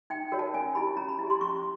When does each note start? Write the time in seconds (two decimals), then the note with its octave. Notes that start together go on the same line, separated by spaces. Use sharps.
0.10 D#4 G5
0.32 F#4 A#4 C#5
0.39 A5
0.54 C#4 G#5
0.75 E4 G4 B5
0.97 C#4 A#5
1.09 B5
1.19 E4 G4
1.30 C6
1.41 C#4 C#6